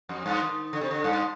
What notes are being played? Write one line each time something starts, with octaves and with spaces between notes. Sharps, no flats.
F2
G2
D#3
D3
C3
D3
G2